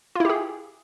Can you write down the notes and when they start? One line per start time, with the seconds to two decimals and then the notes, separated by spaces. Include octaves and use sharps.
0.15 F4
0.20 E4
0.25 G4
0.29 G#4